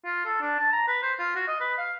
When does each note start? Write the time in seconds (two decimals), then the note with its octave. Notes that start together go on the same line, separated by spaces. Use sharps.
0.05 F4
0.25 A4
0.41 D4
0.60 A5
0.72 A#5
0.88 B4
1.03 C5
1.19 F4
1.36 F#4
1.48 D#5
1.61 B4
1.78 F5